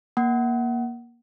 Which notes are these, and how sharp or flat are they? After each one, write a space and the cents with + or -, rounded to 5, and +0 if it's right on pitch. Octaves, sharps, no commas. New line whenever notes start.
A#3 +20 F#5 +20